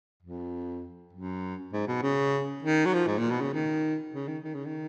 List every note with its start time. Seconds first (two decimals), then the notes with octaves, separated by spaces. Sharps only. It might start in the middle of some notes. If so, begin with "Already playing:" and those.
0.22 F2
1.13 F#2
1.73 G#2
1.88 B2
2.02 C#3
2.63 D#3
2.86 F#3
2.94 F3
3.07 G#2
3.18 A#2
3.31 B2
3.41 C#3
3.54 D#3
4.14 C#3
4.28 D#3
4.44 D#3
4.54 C#3
4.65 D#3